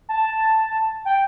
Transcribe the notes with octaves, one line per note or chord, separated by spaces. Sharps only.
A5
G5